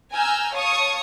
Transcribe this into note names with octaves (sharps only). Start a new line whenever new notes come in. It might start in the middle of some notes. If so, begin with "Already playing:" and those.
G#5 A#5 E6 F6 G6
C#5 F5 A5 C#6 D#6